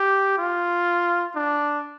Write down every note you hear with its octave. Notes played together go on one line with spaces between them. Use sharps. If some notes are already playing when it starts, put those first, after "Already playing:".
Already playing: G4
F4
D4